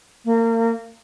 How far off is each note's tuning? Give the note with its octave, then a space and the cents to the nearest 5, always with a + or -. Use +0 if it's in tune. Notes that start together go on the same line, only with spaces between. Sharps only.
A#3 -30